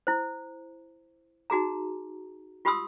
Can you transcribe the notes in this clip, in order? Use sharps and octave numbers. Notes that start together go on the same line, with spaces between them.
E4 C5
D#4 F#4 G#4 A#5
F4 G4 B5 C6 D#6 E6